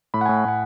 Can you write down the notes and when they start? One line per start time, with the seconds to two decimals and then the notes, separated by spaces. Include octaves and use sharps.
0.14 A2 B5
0.21 F#5
0.26 A2 G#5
0.45 A2 F#5